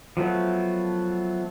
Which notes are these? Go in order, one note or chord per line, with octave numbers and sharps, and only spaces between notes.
F3 F#3 A3 B3